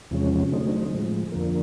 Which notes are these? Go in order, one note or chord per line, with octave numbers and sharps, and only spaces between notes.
E2 C3 F3 G#3 C#4
D3 F#3 A3 C4 D#4
A2 F3 G#3
F2 D3 F3 A#3